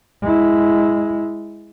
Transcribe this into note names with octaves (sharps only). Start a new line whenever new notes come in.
G#3 E4